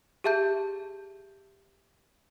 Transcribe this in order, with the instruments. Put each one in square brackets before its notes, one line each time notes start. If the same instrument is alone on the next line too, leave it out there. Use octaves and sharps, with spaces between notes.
[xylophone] G4 G#4 E5 A5 G6